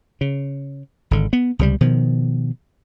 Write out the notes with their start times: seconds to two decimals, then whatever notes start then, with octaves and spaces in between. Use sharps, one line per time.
0.21 C#3
1.11 G#1 D3
1.33 B3
1.59 C#2 C3 E3 G3
1.81 B2 D#3 F3